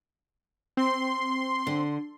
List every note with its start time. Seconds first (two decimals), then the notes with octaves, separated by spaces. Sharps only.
0.77 C4 C6
1.67 D3